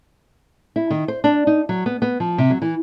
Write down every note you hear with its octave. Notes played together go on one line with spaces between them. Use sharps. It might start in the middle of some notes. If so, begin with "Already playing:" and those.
E4
D#3
C5
D4
D#4
F#3
B3
B3
F3
C3
F#3
E3